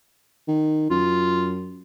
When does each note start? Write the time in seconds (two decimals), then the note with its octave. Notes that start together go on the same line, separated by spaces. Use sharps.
0.48 D#3
0.90 F#2 F4